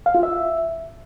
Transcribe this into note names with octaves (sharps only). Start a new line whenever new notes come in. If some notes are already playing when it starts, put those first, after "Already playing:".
F5
F4
E5